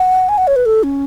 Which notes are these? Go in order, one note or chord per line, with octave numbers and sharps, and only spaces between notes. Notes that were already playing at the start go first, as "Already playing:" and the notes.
Already playing: F#5
G#5
F#5
C#5
B4
A4
C#4